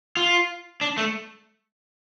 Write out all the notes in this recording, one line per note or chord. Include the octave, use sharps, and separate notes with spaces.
F4
D4
A3